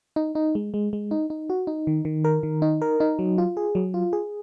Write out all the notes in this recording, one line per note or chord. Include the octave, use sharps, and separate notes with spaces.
D#4
D#4
G#3
G#3
G#3
D#4
D#4
F#4
D#4
D#3
D#3
A#4
D#3
D#4
A#4
D#4
F#3
F4
G#4
F#3
F4
G#4